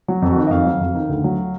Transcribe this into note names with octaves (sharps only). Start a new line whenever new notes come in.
F#3
F2
D#3 F#4
D#5
F2 F5
F#3
F2
D#3
D2
F#3